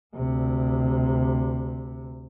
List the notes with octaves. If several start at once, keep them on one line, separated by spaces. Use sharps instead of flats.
D2 C3